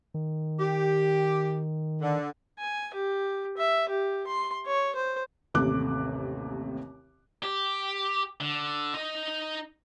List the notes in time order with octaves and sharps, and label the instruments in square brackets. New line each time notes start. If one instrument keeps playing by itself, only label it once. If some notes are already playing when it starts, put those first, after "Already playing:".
[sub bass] D#3
[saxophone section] G4
D3
[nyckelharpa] G#5
G4
E5
G4
C6
C#5
C5
[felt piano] A1 D#2 C3 A3 D6 F#6
[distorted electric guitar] G4
D3
D#4 D#5